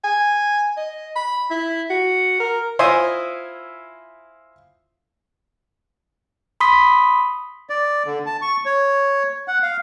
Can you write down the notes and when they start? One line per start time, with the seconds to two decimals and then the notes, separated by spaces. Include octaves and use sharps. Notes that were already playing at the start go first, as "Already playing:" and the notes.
0.04 G#5
0.77 D#5
1.16 B5
1.51 E4
1.90 F#4
2.40 A#4
2.79 E4 F4 C5 D#5 E5 G#5
6.60 B5 C6 D#6 B6
7.70 D5
8.06 D3
8.26 A5
8.42 C#6
8.66 C#5
9.48 F#5
9.63 F5